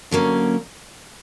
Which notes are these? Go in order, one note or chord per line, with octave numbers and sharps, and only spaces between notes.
D3 F#3 A#3 C#4